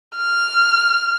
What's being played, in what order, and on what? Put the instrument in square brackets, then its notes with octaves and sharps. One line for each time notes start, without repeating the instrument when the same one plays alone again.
[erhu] F6